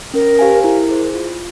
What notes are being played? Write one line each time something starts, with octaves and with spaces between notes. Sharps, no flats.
C#4 A#4
G4 C5 F5 G#5
E4 A#4
G#4 C5
F4